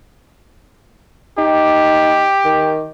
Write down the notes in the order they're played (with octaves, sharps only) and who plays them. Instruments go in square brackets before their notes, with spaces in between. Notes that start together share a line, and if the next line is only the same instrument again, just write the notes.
[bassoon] D#4 [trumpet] G4
[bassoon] D#3